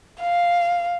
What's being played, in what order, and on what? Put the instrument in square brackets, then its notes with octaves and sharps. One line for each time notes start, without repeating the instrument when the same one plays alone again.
[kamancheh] F5